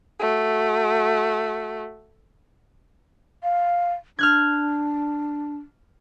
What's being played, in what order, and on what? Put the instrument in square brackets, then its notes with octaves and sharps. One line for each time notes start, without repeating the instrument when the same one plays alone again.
[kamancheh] A3 F#4
[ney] F5
[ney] D4 [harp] F6 F#6 G#6